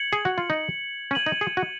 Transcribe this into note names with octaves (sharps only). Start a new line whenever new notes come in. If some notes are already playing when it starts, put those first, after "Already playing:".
Already playing: G#6 C#7 F#7
G#4
F#4
F4
D#4
C#4 G#6 D#7 F#7
D#4
G#4
F#4